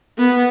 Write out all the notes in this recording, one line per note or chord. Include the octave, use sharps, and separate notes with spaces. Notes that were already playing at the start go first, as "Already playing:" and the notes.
B3